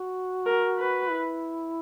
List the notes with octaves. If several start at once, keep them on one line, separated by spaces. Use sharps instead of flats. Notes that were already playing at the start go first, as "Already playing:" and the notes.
Already playing: F#4
A#4
B4
E4